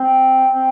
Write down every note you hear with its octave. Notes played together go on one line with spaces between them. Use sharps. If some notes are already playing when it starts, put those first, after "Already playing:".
Already playing: C4
C4